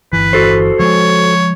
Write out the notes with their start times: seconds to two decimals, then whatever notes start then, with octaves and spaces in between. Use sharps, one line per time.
0.13 G1 E3 B4
0.33 F#4 A4 C5
0.80 F3 G#3 C#5